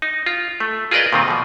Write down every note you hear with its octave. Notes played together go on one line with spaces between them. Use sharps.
D#4
F4
A3
F4 G#4 A#4 B4 D5 D#5
A#2 D#3 C4
B2 F3